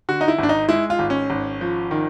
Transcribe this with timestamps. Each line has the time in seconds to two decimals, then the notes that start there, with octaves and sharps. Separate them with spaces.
0.09 D3 F#4
0.21 D#4
0.28 E4
0.39 G#1 D4
0.49 D#4
0.69 G#3 E4
0.90 F4
0.99 G#1
1.10 C#4
1.30 G#1
1.61 F3
1.91 D#3